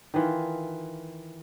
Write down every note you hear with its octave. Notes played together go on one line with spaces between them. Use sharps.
D#3 E3 F4